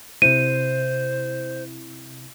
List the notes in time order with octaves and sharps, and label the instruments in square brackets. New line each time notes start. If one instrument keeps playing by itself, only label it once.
[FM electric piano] C3 E4 [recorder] C5 [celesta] D#7